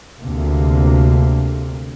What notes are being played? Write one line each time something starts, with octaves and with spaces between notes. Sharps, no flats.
D2 C3 A#3